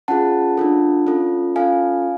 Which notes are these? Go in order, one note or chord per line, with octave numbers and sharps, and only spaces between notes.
C#4 F4 G#4 F#5 A5
D4 F4 A4
C#4 F4 A4
C#4 F4 A4 F5 G#5